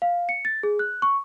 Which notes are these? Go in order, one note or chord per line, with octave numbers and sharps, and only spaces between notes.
F5
C#7
A6
G#4
F#6
C#6